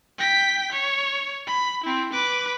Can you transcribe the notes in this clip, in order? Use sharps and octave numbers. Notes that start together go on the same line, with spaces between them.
G5 B6
C#5
B5
C4 E4
B4 D6